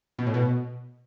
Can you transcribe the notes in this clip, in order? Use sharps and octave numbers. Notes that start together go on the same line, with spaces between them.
B2
A2
B2